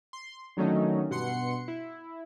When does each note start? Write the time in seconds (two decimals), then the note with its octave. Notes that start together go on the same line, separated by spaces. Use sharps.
0.13 C6
0.57 D3 D#3 F#3 A3 C#4 D#4
1.10 G2 B2 F#5 C6 C#7
1.68 E4